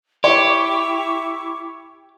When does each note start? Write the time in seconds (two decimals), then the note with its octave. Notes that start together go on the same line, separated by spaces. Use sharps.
0.24 E4 G4 C#5 C#6 D6